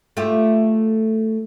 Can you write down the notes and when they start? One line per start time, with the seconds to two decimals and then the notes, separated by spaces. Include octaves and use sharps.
0.17 A3 F4 G4